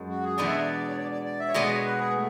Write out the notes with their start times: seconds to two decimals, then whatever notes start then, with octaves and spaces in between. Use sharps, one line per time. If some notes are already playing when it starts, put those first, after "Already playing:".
Already playing: F#2 G#3
0.09 F#4
0.24 G#4
0.38 E2 B2 G#3 B3 D4 D5
0.47 E5
0.55 D5
0.89 C#5
0.97 D5
1.12 D5
1.25 D5
1.40 E5
1.49 C#5
1.54 B2 G#3 B3 D5
1.70 C#5
1.84 B4
1.99 G#4
2.13 A3